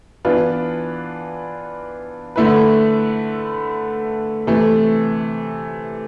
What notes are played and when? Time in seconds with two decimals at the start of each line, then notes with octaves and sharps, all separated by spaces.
0.25 E3 B3 D4 F4 B4
2.36 D3 A3 E4 B4
4.47 C3 E3 A3